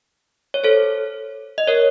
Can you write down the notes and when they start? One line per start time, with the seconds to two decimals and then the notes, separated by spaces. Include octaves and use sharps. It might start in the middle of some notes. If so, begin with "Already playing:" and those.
0.54 C#5
0.64 A4 C5
1.58 D#5
1.67 A#4 C#5